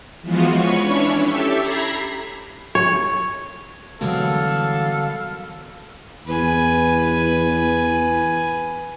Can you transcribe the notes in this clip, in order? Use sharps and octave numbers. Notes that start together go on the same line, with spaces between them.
E3 F3 G#3 B3 F4 F#4
B4 C#5 C#6
C#4 D4 E4 C#5
G4 A4 E5
A#5 B5 G#6 A#6 C7
C#5
F#2 B2 D3 E3 G3 G#3 A4 F5
E2 B4 G#5